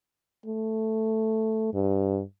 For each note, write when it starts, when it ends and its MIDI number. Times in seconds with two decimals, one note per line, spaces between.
0.46 1.71 57
1.74 2.22 43